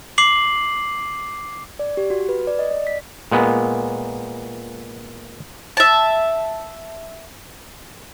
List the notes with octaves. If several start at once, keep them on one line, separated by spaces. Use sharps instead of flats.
D6 C7 F#7
D5
G4
F#4
B4
D5
D#5
D5
B6
A#2 G#3 B3
E5 A5